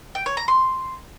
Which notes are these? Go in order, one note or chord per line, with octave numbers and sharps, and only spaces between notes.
G5
C#5
A#5
C6